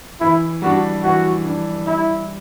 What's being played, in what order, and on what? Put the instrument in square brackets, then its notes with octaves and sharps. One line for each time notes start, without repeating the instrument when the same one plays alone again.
[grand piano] E3 [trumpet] E4
[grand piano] G3 D4 [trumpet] F#4
[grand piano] E3 [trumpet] F#4
[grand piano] G3 D4
[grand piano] G3 [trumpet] E4